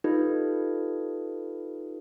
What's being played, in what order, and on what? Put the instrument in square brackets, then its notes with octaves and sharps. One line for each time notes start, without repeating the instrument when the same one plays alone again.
[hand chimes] D#4 F4 G4 A4 B4